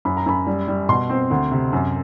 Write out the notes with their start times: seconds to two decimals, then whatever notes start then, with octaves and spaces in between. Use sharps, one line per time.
0.05 F#2 B5
0.17 A#5
0.26 F#2 B5
0.47 G3
0.68 G3
0.89 B2 C6
1.10 C4
1.31 D2
1.51 C3
1.73 F#2